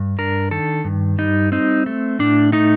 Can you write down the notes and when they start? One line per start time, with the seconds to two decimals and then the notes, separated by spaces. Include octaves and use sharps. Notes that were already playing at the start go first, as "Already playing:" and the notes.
Already playing: G2
0.18 D4 A#4
0.51 D#3 A4
0.85 G2
1.18 G3 D#4
1.52 C4 D#4
1.86 A3
2.19 A2 D4
2.52 A3 D#4